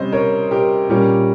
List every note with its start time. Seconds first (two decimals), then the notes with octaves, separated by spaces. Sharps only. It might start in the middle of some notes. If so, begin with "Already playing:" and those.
Already playing: C3 G3 C#4 C5 D#5
0.12 A#4 C#5
0.51 G4 A#4
0.89 A#2 G3 C#4 G4 A#4